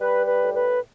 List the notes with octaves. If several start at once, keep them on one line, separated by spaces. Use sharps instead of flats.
G3 B4
B4
A2
B4